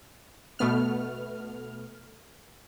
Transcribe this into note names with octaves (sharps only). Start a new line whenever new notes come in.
B2 A3 B3 F6